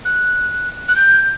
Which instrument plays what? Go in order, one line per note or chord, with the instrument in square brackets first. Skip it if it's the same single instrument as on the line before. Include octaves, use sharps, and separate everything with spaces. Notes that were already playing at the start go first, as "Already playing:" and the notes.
[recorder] F#6
F#6
G6